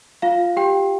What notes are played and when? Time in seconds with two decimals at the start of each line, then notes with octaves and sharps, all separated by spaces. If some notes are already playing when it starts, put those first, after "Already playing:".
0.22 F4 F5
0.57 G4 G5